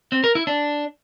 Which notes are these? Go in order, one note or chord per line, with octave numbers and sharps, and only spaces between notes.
C4
A#4
E4
D4